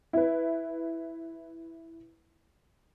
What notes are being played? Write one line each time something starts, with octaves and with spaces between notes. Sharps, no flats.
E4 B4